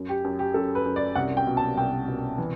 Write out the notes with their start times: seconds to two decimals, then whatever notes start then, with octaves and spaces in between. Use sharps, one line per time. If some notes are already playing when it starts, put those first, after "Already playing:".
Already playing: F#2
0.09 G4
0.24 F#2
0.39 G4
0.54 F#2 A4
0.75 B4
0.86 F#2
0.96 D5
1.15 C2 F#5
1.37 G5
1.47 B2
1.57 A5
1.77 C2 G5
2.08 B2
2.38 E3